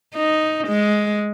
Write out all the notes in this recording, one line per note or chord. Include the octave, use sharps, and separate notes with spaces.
D#4
G#3